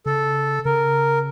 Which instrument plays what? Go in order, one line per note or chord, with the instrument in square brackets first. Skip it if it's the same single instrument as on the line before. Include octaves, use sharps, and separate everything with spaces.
[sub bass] C#3 [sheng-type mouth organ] A4
[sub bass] C#3 [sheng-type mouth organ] A#4